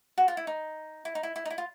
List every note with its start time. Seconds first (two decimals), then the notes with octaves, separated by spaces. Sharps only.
0.18 F#4
0.28 F4
0.37 E4
0.47 D#4
1.05 E4
1.15 D#4
1.23 E4
1.36 E4
1.45 D#4
1.50 E4
1.58 F4